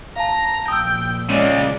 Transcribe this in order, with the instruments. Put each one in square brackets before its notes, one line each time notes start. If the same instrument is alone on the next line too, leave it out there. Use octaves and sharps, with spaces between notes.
[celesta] F5 A5 [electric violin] A#5
[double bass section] A#1 [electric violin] G5 [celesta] D#6 E6
[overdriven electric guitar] C#3 G#3 [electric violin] D5